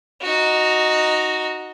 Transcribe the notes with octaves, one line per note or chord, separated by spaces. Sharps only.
D#4 F#4